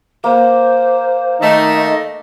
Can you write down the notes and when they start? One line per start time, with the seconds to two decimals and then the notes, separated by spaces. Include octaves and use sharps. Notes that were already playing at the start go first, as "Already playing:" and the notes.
0.24 A#3 C5
1.41 D#3 A3 D#4 D#5